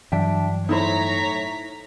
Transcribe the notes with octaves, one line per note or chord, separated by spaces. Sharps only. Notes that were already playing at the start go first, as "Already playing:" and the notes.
G2 E3 F#3 D4 E5 G5
A2 D#4 E4 C5 C#5 A#5 B6